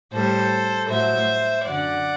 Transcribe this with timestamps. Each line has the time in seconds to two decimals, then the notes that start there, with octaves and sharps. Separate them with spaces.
0.12 A2 G3 A4 C5
0.89 A2 F#3 C5 E5
1.65 F#2 D3 F#3 D5 F#5